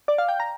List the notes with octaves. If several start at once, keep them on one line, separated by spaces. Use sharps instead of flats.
D5
F5
G5
A#5